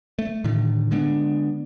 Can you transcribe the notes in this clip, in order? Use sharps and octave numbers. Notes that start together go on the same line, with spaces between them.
A3
A2 D3 D#3
D3 G#3 B3 D4